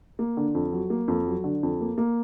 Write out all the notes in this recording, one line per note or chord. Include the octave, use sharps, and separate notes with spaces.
A#3
D3
F2
F#3
A#3
F2
F#3
D3
F2
A#3
A#3